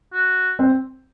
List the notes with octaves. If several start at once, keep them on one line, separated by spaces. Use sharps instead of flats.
F#4
C4